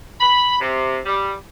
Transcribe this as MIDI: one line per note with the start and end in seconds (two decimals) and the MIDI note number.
0.20 0.56 83
0.61 0.99 48
1.05 1.33 55